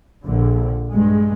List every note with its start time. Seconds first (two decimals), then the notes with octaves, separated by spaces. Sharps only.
0.24 A#1 D3
0.92 G2 G#3